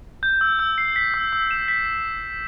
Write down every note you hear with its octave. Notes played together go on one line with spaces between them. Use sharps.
G6
E6
E6
C7
B6
E6
E6
E7
B6